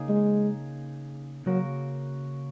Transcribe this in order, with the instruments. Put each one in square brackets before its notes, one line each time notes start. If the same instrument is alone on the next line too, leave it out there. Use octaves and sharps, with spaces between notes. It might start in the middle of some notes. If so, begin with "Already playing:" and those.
Already playing: [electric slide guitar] C#3 A#3 D#4 G#4
[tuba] G#3
[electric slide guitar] C#3 A#3 F#4 A#4 [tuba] F#3